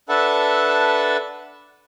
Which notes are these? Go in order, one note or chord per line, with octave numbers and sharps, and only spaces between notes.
D4 A4 B4 E5 F#5 A5